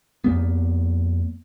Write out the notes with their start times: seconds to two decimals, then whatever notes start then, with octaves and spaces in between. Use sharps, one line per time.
0.24 F2 A#3 B3